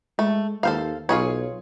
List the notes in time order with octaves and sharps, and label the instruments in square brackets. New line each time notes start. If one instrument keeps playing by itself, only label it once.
[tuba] G#3 [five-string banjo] A3
[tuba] D#2 [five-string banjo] A4 C5 F5
[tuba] B1 [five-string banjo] F4 G#4 C#5